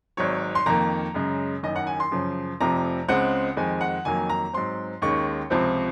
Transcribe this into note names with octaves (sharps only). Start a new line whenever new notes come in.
G#1 G#2 F#3 C4 C#5
C6
F2 D#3 A#3 A#5
F#2 C#3 G#3
F#1 F#2 D#3 D#5
F#5
G#5
C6
F#2 C#3 F3
F1 F2 C3 F3 A#5
C#2 C#3 G#3 C4 F#5
F2 D#3 G#3 C4 G#5
F#5
F2 D#3 F#3 A#3 G#5
A#5
G#2 F#3 C4 C6
D#2 D#3 G#3 C#4 C#6
C#2 C3 F3 C4